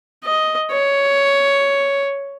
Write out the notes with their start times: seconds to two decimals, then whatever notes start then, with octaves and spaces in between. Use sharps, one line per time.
0.24 D#5
0.71 C#5